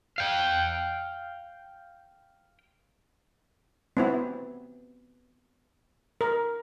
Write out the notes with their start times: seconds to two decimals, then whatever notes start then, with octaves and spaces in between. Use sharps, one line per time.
0.18 F5 G5
3.97 B3 C4 E4
6.21 A#4